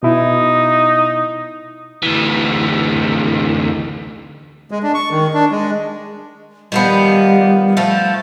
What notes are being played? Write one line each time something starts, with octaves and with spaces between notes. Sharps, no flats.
B2 D#4 E4
D2 E3
G#3
D4
C#6
D#3
D4
G#3
D#3 F3 G3 B3
F3 A3